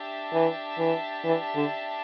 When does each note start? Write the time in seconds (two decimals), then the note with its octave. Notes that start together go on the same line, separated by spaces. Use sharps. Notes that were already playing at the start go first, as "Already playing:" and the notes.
Already playing: D4 G4 E5 A5
0.33 E3
0.78 E3
1.25 E3
1.55 D3